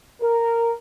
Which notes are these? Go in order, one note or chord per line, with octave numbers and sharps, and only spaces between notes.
A#4